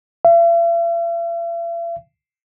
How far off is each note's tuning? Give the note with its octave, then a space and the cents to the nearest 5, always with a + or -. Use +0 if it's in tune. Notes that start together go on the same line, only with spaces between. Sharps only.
E5 +45